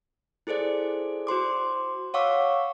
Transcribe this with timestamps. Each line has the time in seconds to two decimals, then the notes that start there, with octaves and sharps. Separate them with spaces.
0.47 E4 G#4 A4 C5 D5
1.27 F#4 C5 C6 D6
2.14 C#5 F5 F#5 C#6 D6 E6